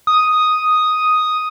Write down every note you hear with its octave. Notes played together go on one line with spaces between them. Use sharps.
D#6